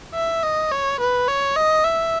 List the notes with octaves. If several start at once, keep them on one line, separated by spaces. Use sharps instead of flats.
E5
D#5
C#5
B4
C#5
D#5
E5